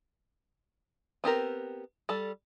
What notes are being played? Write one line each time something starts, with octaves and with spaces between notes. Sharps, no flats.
B3 C4 G4 A#4
G3 A4